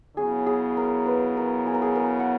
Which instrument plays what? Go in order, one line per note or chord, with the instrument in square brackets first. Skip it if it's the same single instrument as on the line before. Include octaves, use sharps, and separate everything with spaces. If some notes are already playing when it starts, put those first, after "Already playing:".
[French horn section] C#3 F#3 B3 E4 [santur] G#4
[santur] G#4
A#4
B4
A#4
G#4
A#4
G#4
A#4
F#5